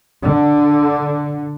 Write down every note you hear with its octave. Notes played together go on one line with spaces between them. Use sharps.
D3